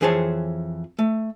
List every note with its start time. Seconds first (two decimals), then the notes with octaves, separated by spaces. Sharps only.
0.01 F2 E3 G#4 C5 C#5 A5
0.99 A3